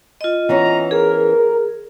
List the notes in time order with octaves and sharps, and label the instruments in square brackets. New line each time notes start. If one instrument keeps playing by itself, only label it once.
[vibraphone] F4 D#5
[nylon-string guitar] E3 B3 C#4 [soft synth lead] A#5
[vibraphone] G#4 [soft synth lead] A#4